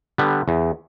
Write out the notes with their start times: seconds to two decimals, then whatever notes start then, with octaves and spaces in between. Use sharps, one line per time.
0.18 D3 G3 B3
0.48 E2